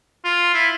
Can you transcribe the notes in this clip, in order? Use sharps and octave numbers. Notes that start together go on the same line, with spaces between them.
F4
E4